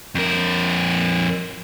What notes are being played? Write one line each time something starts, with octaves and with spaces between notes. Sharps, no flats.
F2 A#4